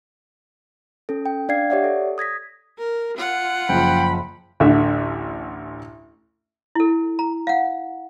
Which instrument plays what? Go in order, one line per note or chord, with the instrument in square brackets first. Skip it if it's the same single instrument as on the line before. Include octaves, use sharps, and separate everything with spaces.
[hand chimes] C#4 A4
G5
D4 D5 F5 G5 G#6 C7
G4 C#5 D5 E5 F#5
A4
D#6 G#6 A#6 B6
[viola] A#4
F4 F#5
[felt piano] F#1 F3 [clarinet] G5 [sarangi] B5
[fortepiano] A1 D2 D3 E5
[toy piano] E4 A4
A#5
F5 F#5